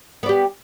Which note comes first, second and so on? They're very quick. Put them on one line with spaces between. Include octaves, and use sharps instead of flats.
B3 D5 G4